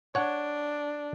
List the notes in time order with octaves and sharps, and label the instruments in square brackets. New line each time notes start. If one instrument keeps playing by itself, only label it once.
[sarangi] D4 [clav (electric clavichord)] C#5 F#5